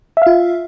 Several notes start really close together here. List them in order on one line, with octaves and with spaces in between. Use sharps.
E5 F5 F4